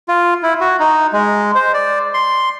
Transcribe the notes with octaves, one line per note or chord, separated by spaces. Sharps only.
F4
E4
F#4
D#4
G#3
C5
D5
C6